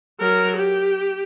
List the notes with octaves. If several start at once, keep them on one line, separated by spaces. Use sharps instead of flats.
F#3 A#4
G4